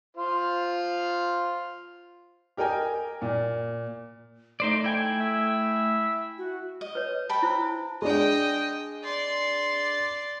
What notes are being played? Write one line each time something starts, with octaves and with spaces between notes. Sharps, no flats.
F4 C5
G4 A#4 D#5 G5 G#5
A#2
A3 D#4 C5 D5
E4 G5 G#5
E5
F#4
D#5
B4 C#5
G5 A5 B5
E4 C5 E6
G#3 D4 D#5 G5
D5 C6